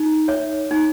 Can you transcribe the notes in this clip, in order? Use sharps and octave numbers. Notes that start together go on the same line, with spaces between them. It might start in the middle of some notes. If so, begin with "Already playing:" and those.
Already playing: D#4
C#5 E5
D#4